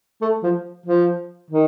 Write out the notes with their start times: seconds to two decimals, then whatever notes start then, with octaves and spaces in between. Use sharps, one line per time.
0.21 A3
0.43 F3
0.86 F3
1.50 D#3